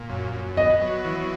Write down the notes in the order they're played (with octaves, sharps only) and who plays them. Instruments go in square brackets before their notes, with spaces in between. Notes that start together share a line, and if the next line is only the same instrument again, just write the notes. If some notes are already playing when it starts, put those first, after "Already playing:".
Already playing: [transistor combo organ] A#2
F#2
F#2
[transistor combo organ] B3 [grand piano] D#5
[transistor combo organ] F#3
E3